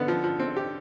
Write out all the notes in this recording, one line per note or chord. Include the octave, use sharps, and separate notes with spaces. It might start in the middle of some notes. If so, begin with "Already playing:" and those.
Already playing: D3 B3
F3
F3
C4
G4